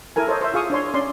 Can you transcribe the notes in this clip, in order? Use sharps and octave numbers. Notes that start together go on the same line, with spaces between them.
E4 A4 A#4 G#5
A4 C5 C#5 D#5
C5 E5
F4 G#4 F5 C#6 D#6
D4 C#5 C6
C#4 D5 C6